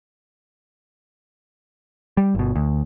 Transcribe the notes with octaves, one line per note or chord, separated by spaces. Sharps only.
G3
G1 B2
D2